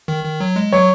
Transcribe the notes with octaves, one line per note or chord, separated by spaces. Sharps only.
D#3
D#3
F#3
G#3
F#3 C#5